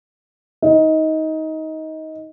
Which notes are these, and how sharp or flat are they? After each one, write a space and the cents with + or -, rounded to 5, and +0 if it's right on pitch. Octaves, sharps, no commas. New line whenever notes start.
D#4 +20